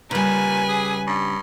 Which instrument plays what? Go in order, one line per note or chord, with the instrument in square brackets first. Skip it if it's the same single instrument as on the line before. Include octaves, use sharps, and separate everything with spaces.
[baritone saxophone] A#2 [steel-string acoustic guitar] C#3 G3 [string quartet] B4 G#5
[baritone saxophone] G#4
G2